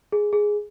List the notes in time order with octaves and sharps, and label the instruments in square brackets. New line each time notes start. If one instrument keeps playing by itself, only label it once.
[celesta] G#4
G#4